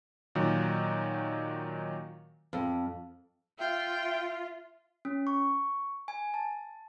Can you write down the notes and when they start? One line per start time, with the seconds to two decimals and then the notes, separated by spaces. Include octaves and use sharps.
0.35 A#2 D#3 F#3
2.53 F2
3.59 F4 E5 G5
5.05 C#4
5.27 C#6
6.08 G#5
6.34 A5